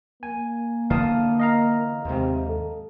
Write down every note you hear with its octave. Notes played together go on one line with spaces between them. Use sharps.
A#3 G#5
D3 E3 B3 F5 A5 D#6
D#5 F5 A#5
D#2 G#2 C3
A4